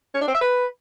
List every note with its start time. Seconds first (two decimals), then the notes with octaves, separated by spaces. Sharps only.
0.14 C#4
0.21 D4
0.28 C4
0.34 E5
0.41 B4